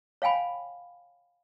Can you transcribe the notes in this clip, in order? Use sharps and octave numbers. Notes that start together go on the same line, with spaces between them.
C#5 F5 G5 G#5 B5